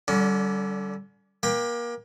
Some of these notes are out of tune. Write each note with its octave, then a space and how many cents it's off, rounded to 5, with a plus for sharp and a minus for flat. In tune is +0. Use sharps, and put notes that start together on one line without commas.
D3 +0 G3 -20 C#4 +35
A#3 +30 G5 +25 B5 +0